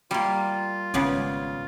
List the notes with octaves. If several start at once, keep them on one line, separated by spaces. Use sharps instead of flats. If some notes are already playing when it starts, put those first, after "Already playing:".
G3 A#3 F4
G#1 C#3 B3 D5